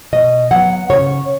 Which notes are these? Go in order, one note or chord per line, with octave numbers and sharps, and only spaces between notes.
B2 D#5
F#3 B3 F#5
C#3 C#5